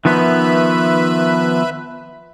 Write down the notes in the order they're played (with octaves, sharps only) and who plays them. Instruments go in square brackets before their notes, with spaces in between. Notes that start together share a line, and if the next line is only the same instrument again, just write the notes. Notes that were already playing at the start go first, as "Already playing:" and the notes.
[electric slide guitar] D#3 F3 B3 [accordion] B4 E5 B5